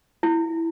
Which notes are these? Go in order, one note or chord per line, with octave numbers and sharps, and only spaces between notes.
E4